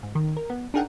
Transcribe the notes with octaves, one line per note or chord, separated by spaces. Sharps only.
G#2
D#3
A#4
B3
D4 D#4 G#4 A#4 F#5 G5